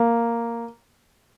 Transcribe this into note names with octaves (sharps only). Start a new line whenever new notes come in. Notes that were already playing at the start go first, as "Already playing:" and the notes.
Already playing: A#3